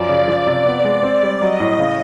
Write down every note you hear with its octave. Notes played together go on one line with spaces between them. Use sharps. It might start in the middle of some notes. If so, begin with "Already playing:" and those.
Already playing: F#2 F3 D5
C#3
F3
C3
B3 D5
G#3
C4
G3
F#3 D#5
A2
C#3